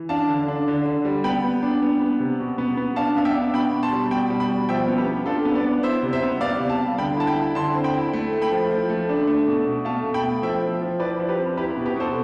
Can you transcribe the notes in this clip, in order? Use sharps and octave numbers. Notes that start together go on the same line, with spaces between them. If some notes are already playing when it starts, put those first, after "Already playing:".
Already playing: E3
D4 F5 A5
D3
D4
D3
D3
G3
B3 G5 B5
B3
D4
B3
B3
C3
B2
B3
B3
D4 F5 A5
B3 F5
E5 G5
D4
B2 G5 B5
B2
A5 C6
G3
B2 G5 B5
G3
G5 B5
B2
F3 E5 G5
B3
G4 B4
B3
D4 F4 A4
B3
B4 D5
B3
E4 C5 E5
C3
C5 E5
B3
B3 D5 F5
C3
F5 A5
G3
D3 G5 B5
E4 A5
G5 B5
E4
D3 A5 C6
C4
G5 B5
E4
A3
A3
G5 B5
F3
F3
A3
D4
A3
B2
B2
A3 F5 A5
B2
G5 B5
A3
F3 E5 G5
F3
F3
E4 B4 D5
F3
G4 B4
C4
E4 G4 B4
B2
G4 B4
B2 A4 C5